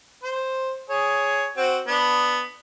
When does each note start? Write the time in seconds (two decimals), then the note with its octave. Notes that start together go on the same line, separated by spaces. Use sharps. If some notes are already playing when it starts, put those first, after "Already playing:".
0.23 C5
0.90 G#4 C#5
1.57 C4 F#4
1.88 B3 D4